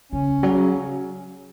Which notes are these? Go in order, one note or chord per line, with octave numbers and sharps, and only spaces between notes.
C#3 C#4
C#3 F#3